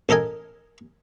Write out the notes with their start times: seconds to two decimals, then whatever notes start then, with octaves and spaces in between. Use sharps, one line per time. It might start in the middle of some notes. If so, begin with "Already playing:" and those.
0.09 A1 A4 A#4 D#5 G#5